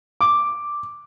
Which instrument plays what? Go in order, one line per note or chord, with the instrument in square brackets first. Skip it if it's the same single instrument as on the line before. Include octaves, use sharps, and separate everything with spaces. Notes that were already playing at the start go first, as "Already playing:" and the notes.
[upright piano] D6